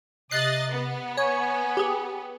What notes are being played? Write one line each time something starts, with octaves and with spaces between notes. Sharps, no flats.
C3 D#5 F#6 A6 C7
B3
C#5 G#5
G4 G#4